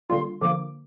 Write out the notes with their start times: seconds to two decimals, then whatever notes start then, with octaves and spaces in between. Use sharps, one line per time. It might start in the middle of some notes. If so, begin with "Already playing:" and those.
0.09 D3 G3 A#3 F4 C6
0.41 D3 F3 A#3 D6